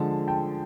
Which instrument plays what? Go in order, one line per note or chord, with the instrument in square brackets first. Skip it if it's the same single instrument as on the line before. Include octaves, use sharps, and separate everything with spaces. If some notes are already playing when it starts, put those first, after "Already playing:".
Already playing: [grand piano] D3 F3 G#3 A5
G5 A5